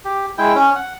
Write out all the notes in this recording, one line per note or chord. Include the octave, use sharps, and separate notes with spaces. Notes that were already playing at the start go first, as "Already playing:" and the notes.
G4
G#3 E4 G5
C#4
F#5